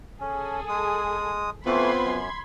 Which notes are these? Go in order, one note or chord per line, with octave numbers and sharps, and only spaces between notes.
C#4 G#4 A4
G#3 D#6
E3 A3 B3 C4 F4 B5 C6 G#6
F#2